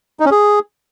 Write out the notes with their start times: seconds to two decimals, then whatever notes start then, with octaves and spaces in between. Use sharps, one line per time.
0.20 D#4
0.26 C#4
0.31 G#4